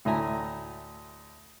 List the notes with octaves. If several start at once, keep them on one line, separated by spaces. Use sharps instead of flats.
D2 A2 E5 G#5 A#5